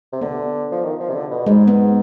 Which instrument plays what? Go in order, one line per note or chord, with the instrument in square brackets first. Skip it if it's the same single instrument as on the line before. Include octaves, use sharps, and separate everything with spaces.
[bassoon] C3
[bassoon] D3 [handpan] B3
[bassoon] F3
D#3
F3
C3
D3
B2
[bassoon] G#2 [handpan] G#3
[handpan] B3